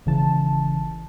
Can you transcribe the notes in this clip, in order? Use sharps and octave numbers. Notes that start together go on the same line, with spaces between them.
G#1 C#3 E3 A5